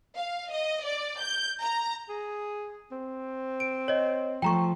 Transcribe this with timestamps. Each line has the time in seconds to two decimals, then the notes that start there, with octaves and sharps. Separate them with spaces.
0.16 F5
0.51 D#5
0.84 D5
1.21 G6
1.62 A#5
2.09 G#4
2.92 C4
3.60 D7
3.88 C#5 D#5
4.42 F3 A3 G5 A#5 C#6